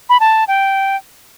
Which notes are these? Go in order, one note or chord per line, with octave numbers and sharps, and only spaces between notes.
B5
A5
G5